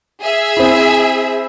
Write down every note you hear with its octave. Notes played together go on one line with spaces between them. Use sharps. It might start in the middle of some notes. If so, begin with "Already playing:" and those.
G#4 E5
C4 E4